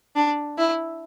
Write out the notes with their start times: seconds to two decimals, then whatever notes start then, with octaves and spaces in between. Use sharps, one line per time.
0.16 D4
0.58 E4